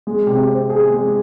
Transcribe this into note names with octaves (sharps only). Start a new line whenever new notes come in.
G#3
C3
C4
G#4
G#3